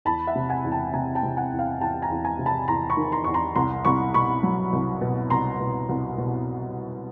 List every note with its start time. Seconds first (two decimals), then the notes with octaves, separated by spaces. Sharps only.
0.05 E2 A5 B5
0.27 E5 F#5
0.35 C3
0.49 F#5 G#5
0.65 E2
0.72 G5 A5
0.93 C3 G#5 A#5
1.15 G5 A5
1.23 C3
1.37 F#5 G#5
1.51 E2
1.59 F5 G5
1.80 E2 G5 A5
2.02 G#5 A#5
2.10 E2
2.25 G#5 A#5
2.39 C3
2.46 A5 B5
2.68 E2 A#5 C6
2.90 B5 C#6
2.97 D#3
3.12 A#5 C6
3.24 E2 C#6
3.34 A#5 C6
3.56 C2 A#5 C6
3.85 C2 B5 C#6
4.14 B2 B5 C#6
4.43 F#3
4.73 C2
5.01 B2
5.30 C2 A#5 C6
5.60 B2
5.89 C2
6.18 B2